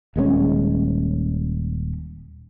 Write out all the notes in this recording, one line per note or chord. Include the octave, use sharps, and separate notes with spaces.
D#1 G#3 A3 C#4